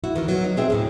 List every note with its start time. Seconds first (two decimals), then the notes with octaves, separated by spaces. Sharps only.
0.04 E4 F#4
0.15 D#3 E3 A#4
0.28 F#3 B3
0.44 D#4
0.57 B2 C4 G#4 E5 G5
0.70 D2 A2 G#4